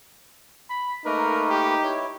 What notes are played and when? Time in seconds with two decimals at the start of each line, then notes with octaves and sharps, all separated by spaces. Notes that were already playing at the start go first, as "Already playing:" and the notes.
0.70 B5
1.06 A3 A#3 D#4 A#4 B4
1.50 G4
1.84 E4 C#5